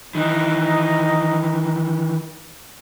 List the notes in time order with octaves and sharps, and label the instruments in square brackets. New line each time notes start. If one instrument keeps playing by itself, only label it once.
[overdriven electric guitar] D#3 E3 [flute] D#4